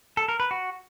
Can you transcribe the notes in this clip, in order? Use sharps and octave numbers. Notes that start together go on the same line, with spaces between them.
A4
A#4
B4
F#4